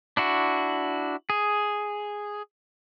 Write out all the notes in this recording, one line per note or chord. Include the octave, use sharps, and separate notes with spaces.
D4 E4 F#4
G#4